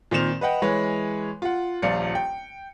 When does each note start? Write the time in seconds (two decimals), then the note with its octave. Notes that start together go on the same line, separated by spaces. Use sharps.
0.11 A#2 D#3 C4 E7 F7
0.41 B4 D#5 F#5 G5
0.62 E3 G#3 B4 C#5
1.42 F4 F#5
1.82 D#1 A#1 D5 F5 C#7
2.15 G5